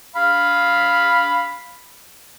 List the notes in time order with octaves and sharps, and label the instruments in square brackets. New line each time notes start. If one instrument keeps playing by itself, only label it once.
[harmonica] F5 B5